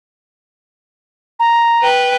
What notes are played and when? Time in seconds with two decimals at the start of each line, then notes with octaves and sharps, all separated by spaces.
1.39 A#5
1.82 B4 G5